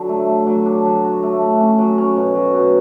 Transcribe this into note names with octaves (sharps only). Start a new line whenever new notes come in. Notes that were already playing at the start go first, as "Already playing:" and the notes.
Already playing: D3 F#3
A3
A3
F#3
D4
F#3
F#4
A3
A3
C#4
F#3
C#4
B2
F#3
B2